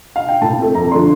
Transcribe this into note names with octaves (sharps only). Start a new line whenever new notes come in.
F5
G5
A2 A5
A3 C4
F2 A#5
D3 F3 A3 D4 C6